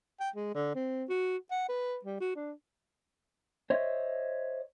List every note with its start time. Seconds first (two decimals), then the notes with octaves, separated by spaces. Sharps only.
0.20 G5
0.35 G#3
0.54 D3
0.75 C4
1.09 F#4
1.51 F#5
1.69 B4
2.05 G3
2.20 F#4
2.36 D4
3.70 C5 C#5 D#5 E5